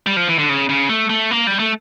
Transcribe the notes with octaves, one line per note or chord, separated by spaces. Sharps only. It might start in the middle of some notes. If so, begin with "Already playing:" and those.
G3
F3
E3
D3
C#3
C#3
A3
A3
A#3
G3
A3